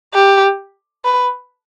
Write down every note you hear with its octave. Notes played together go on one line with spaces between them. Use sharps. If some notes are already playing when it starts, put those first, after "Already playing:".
G4
B4